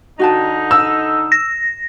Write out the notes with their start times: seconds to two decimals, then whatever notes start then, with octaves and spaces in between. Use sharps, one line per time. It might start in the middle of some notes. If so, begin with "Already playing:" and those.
0.19 D3 D#4 F#4 G5 A5
0.71 E6
1.32 A#6